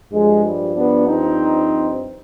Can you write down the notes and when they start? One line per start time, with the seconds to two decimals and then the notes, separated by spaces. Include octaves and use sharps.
0.12 G2 F3 G#3
0.44 G3
0.75 B3 D4
1.07 C4 D#4